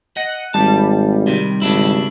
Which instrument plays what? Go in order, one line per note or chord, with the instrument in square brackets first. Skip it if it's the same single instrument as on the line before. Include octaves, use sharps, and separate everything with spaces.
[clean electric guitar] D#5 [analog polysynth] F#5
[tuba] G#1 [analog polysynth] G3 [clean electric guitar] A5
[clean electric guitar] C3 D#3
[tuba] G#1 [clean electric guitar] C#3 D4 E4